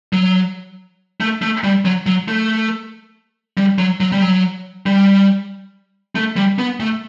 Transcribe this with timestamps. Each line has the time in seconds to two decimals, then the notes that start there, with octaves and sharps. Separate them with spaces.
0.13 F#3
1.20 A3
1.42 A3
1.64 G3
1.85 F#3
2.06 F#3
2.28 A3
3.57 G3
3.78 F#3
4.00 F#3
4.12 G3
4.22 F#3
4.86 G3
6.15 A3
6.36 G3
6.59 B3
6.80 A3